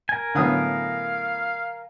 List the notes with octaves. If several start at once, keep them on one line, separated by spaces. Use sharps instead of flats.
A#4 G#5
A2 D3 F#3 B3 F5 D#6